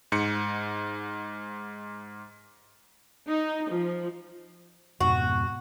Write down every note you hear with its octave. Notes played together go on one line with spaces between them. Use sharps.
G#2 C#7
D#4
F3
F2 G#2 B2 F#4